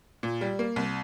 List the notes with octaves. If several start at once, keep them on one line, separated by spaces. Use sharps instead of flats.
A#2
G3
A#3
C2